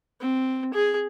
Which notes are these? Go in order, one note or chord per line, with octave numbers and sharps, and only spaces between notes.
C4
G#4